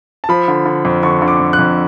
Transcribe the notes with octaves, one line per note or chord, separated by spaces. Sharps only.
A5
F3 B5
D3
D3
F2
D3 C#6
D3
D6
F2
F#6
F2